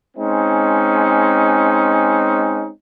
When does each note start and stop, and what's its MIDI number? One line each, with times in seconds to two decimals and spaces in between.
0.17 2.68 56
0.17 2.68 60
0.17 2.68 61
0.17 2.68 63